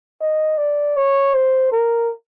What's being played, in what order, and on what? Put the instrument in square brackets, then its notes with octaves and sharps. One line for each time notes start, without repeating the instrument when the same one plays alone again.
[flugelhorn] D#5
D5
C#5
C5
A#4